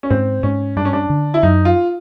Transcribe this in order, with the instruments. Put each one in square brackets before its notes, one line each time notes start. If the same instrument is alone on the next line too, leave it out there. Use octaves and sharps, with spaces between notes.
[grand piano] C#4
[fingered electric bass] G#2 [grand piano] C4
[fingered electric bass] G#2 [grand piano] C#4
[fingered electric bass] G2 [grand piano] D4
[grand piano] C#4
D4
[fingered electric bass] D3
[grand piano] E4
[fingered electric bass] F#2 [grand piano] D#4
[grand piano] F4